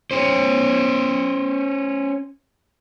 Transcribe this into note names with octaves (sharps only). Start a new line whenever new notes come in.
C#4 C5